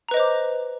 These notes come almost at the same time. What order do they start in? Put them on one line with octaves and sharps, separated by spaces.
A#5 B4 D#5 C5 D6